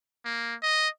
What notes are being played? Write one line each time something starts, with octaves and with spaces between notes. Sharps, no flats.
A#3
D#5